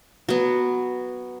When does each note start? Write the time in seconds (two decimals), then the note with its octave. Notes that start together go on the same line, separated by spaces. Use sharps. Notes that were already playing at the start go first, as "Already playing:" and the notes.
0.29 F#3 B3